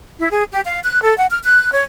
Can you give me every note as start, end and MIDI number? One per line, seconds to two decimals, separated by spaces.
0.18 0.28 64
0.30 0.42 68
0.50 0.60 67
0.64 0.78 77
0.84 1.01 90
1.02 1.15 69
1.16 1.25 78
1.29 1.38 89
1.43 1.71 90
1.72 1.82 73